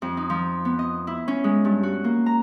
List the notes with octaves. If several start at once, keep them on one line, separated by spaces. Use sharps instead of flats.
F2
D#4
F3
B3
D#5
E4
C#4
G#3
G2
F#4
A#3
A#5